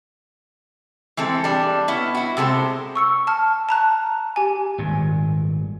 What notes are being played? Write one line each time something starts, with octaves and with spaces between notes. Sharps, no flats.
E3 G#3 C4 A4
G3 D4
B3 C#4 E4
E4 F#4
C3 G#3 A4 C5
C#6 E6 C#7
A5 F6
A5 A#5 F#6
G4 G#5
G#1 G2 A#2